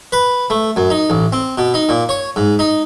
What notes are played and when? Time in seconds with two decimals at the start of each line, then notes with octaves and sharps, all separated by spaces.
0.12 B4
0.50 A3
0.76 F#2
0.90 D#4
1.10 A1
1.33 C4
1.58 B2
1.74 D#4
1.89 A#2
2.09 C#5
2.36 G#2
2.59 D#4